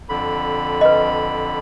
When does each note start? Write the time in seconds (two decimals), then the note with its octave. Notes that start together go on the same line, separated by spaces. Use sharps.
0.09 F2 D3 B5
0.81 B4 D#5